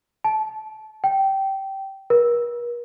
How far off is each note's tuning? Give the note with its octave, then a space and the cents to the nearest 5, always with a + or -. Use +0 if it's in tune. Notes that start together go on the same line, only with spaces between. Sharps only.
A5 -20
G5 -15
A#4 +45